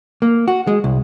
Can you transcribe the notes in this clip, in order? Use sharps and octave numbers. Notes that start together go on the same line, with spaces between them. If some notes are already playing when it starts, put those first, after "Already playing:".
A#3
F#4
G#3
C2